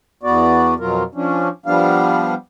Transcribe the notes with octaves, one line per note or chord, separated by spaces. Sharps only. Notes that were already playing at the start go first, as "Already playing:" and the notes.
E2 B3 F#4 D5
F2 B2 F#3 F4 A#4
F3 C#4 D4
F3 G3 B3 D4 F5